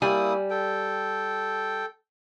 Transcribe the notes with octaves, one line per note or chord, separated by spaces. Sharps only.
G3 A#3 E4 G#5 D#6
A4 G5